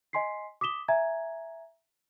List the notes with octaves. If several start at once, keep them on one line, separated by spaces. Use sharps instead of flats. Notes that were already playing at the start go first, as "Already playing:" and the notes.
D#5 G#5 C6 B6 C7
D6 D#6 B6 E7 G7
E5 G#5 A#5 G#6